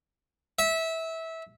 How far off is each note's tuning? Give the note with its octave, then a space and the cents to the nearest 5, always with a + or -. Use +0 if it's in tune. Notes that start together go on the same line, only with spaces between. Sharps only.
E5 -20